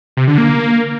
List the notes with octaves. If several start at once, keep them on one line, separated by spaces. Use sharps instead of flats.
C3
D3
A#3